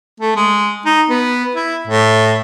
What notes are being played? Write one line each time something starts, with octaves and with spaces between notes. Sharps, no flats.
A3
G#3
D#4
B3
E4
A2